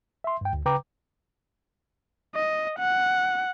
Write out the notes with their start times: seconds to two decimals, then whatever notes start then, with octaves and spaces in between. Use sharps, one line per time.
0.24 E5 C6
0.41 G2 G5
0.53 D2
0.66 C#3 B4 G5 A#5 D6
2.35 D#5
2.79 F#5